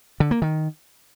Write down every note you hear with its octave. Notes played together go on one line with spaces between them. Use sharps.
D3
A#3
D#3